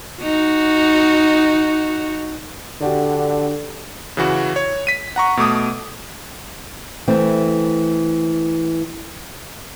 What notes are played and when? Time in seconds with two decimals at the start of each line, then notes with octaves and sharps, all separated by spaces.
0.22 D#4 F#4
2.81 D3 D4 F#4 G4
4.17 C#3 E3 F#4
4.56 C#5
4.87 B6 D#7
5.16 F#5 A#5 C#6
5.37 B2 A3 D6 D#6
7.08 E3 A3 C4